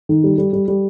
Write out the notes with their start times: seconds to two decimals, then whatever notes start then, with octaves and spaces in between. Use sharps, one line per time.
0.09 D#3
0.24 G3
0.38 G3
0.53 G3
0.68 G3